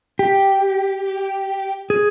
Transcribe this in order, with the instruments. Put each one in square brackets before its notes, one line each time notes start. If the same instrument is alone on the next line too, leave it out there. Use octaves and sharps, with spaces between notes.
[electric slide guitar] G4
G#4